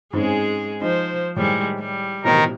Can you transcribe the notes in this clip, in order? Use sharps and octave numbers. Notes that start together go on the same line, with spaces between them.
G#2 G#3 C4 C#4 G#4
F3 D#4 C5
A2 D#3 G3 G#3
G3
A1 B2 D#3 A#4 C5